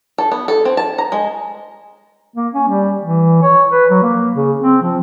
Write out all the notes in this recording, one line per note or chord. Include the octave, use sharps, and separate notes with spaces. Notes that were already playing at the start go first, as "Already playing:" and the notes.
A4
B3
A4
C4
A5
A#5
G#3
A#3
C#4
G3
E3
C#5
B4
F#3
A#3
C#3
C4
F3